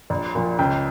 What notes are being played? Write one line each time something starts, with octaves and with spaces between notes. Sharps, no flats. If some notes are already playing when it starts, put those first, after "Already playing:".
A#1
A#2 F3
C#2 G5